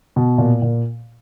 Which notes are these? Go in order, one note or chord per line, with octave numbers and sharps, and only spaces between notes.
B2
A#2
A#2